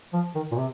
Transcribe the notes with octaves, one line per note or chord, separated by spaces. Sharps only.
F3
D#3
A#2
C3